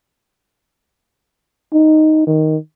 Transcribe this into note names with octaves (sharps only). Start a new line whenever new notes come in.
D#4
D#3